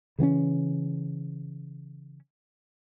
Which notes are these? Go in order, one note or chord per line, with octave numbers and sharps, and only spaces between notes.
C#3 E3 C4 C#4